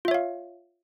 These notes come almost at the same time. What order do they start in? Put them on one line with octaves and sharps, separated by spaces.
F4 E5 C#5 F5